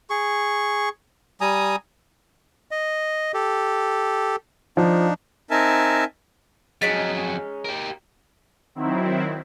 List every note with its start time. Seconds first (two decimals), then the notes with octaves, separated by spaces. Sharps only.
0.10 G#4 C#6
1.41 G3 G#5 A#5 D#6
2.71 D#5
3.34 G4 A4
4.77 F3 D4 D#4
5.51 C4 D#4 A#4 E5 G#5 A5
6.82 F2 F#3 G#3 C#4 D#4 A6 B6 D7
7.65 G4 A#4
8.75 D#3 F#3 C4 E4